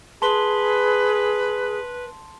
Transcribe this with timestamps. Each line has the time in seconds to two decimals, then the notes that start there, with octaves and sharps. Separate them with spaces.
0.22 G#4 B4 A5 C6 G7